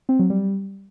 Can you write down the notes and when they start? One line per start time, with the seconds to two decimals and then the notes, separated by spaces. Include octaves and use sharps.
0.09 C4
0.19 F#3
0.30 G3